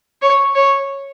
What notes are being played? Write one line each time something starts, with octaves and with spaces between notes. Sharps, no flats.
C#5
C#5